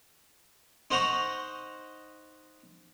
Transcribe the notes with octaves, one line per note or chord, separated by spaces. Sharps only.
D#4 C5 F#5 A#5 C6 C#6